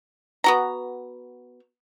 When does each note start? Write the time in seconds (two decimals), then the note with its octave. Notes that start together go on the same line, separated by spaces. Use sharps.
0.44 B3 F#4 A#5